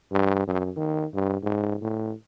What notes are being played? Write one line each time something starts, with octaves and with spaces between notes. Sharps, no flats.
G2
F#2
D#3
G2
G#2
A2